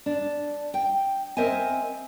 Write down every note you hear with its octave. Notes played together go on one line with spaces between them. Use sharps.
D4
G5
C4 A#4 C5 D#5 E5 G#5